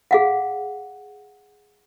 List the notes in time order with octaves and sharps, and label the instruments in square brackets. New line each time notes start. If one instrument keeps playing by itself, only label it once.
[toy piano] G#4 F5 F#5